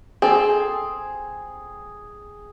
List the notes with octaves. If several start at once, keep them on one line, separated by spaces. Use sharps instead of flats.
C4 G#4 A4